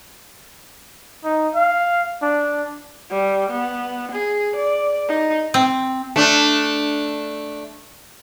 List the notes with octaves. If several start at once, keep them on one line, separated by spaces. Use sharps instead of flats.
D#4
F5
D4
G3
B3
G#4
D5
D#4
C4
A3 D4